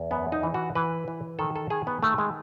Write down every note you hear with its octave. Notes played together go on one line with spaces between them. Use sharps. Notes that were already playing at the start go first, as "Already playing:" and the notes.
Already playing: E2
F#2 B3
D#4
E3
F#4
E3 B4
E3
D#3 A4
A4
D#3 G#4
B3
D#3 A3
G#3